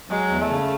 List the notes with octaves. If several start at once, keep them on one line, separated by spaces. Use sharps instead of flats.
F#3 G#3
E2
A3
C#3